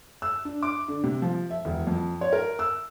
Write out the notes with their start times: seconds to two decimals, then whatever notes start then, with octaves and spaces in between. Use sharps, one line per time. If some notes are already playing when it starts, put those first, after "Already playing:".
0.22 E6
0.45 D4
0.63 D6
0.88 D3
1.03 C3
1.22 F3
1.50 E5
1.65 E1
1.87 F2
2.21 C#5
2.33 A#4
2.59 E6